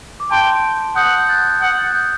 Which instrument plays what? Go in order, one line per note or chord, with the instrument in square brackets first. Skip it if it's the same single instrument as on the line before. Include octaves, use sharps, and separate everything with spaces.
[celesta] D6
[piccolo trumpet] G5 [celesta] A5 C6
[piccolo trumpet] F#5 [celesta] D#6 G6
[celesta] G6
F#6 A6
[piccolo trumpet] F#5 [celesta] D#6 G6
[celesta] F#6 A6
D#6 G6